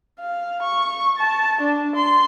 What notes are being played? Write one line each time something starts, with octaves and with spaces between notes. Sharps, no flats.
F5
C#6
A5
D4
C6